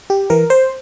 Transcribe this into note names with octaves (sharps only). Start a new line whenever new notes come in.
G4
E3 A#4
C5